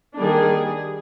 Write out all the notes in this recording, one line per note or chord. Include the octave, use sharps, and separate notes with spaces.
D#3 G3 A#3 D4 G#4